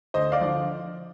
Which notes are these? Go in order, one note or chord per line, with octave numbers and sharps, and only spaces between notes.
D2 C5 D#5
D5 F5
D3 F3